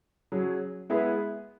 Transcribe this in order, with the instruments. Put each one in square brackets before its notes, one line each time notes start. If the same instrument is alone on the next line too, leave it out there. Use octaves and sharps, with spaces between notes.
[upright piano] F#3 C#4 G#4
G#3 B3 E4 G#4 B4